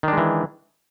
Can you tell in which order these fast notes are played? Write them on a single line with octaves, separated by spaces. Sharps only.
D#3 D4 G#3 E3